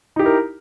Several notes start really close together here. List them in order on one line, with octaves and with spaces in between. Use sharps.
D#4 G4 E4 A#4